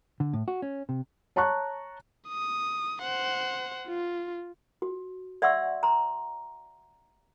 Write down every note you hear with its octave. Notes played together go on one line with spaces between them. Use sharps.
D3
A2
F#4
C#4
C3
C#5 A5 A#5 C#6 F#6
D#6
C5 F#5
F4
F#4
D5 E5 F#5 C6 C#6 E6
A#5 C6